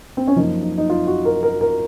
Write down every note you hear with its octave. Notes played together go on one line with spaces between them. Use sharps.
C4
C#4
F#2 F3 A#3 D#4
D#4
D#4
F4
F#4
A#4
A#4
A#4